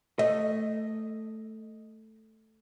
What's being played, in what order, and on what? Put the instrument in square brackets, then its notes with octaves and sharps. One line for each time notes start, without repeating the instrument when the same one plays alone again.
[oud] A3 [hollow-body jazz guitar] D#5